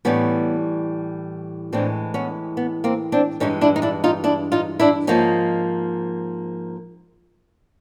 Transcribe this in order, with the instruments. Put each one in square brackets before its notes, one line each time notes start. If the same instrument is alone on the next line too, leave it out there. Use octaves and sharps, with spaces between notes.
[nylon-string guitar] A2 E3 G3 B3 C#4
A2 E3 G#3 C4 D4
B3 C#4
B3
A#3 C4
C4 D4
G2 E3 G#3 C#4 D#4
D4 E4
D#4
D4 E4
D#4 F4
D4 E4
D#4 F4
D4 E4
G#2 F3 A#3 C#4 D#4